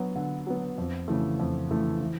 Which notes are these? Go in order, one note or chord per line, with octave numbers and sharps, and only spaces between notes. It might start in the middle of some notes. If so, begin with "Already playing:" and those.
Already playing: F#3 B3
D3
F#3 B3
F2
C#3 E3 A3
F2
C#3 E3 A3
E3